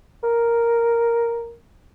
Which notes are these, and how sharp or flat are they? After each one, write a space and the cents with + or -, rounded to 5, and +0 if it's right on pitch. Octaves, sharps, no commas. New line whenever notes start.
A#4 +0